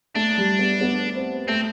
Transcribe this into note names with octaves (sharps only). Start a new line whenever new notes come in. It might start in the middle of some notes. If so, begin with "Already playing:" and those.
A3 D4
G3
B3
B3
C4
A3 C4